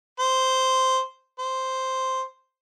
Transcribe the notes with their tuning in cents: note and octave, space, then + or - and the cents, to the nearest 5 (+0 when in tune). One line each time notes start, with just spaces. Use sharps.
C5 -5
C5 +0